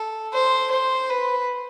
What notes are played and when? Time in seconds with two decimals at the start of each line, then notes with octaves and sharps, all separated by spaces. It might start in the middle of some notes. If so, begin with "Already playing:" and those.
Already playing: A4
0.33 C5
0.71 C5
1.09 B4